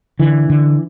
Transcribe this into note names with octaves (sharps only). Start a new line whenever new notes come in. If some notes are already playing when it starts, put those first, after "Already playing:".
D3 E3
D3